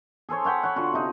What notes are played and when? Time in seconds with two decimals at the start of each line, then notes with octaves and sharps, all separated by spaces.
0.29 G#4 A4 C5 C#5
0.45 C#5 F#5 G5 B5
0.63 C#5 F#5
0.76 D3 F4 F#4
0.93 C3 D#4